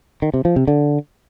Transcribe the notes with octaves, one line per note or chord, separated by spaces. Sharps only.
D#3
C3
F3
C3
D3